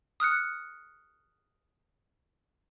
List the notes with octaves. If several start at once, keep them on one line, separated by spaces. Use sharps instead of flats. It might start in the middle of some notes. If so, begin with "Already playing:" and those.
D#6 F6 F#6 C#7